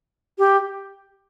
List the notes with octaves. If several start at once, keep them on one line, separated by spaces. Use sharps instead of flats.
G4